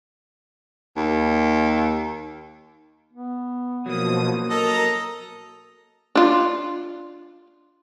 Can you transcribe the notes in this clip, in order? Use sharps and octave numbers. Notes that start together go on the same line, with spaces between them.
D#2
B3
B2 F3 F#3 A#3 D#6
A4 A#4 D#5 A#5
D4 F4